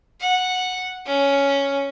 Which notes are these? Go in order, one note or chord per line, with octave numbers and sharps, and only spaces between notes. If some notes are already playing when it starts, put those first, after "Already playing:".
F#5
C#4